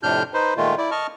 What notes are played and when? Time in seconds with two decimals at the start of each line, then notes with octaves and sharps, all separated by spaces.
0.03 F2 A2 C3 D4 F6 G6
0.34 D#4 B4 C5
0.57 A#2 D#3 G#3 A3 F4
0.78 E4 D5
0.91 D#5 A5 C#6 F6